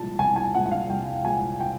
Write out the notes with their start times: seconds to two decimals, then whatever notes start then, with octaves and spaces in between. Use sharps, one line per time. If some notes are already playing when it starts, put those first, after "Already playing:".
Already playing: C2 A#2 F3 G#3 A5
0.19 C2 G#5
0.36 G#5
0.54 A#2 F3 G#3 F#5
0.66 F#5
0.71 F5
0.90 C2 G5
1.25 A#2 F3 G#3 G#5
1.60 G5